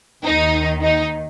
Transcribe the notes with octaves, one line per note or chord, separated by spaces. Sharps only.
D#2 D#3 D#4
D#4